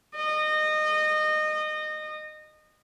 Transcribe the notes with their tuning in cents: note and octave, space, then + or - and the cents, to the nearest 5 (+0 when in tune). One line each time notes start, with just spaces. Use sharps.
D#5 -25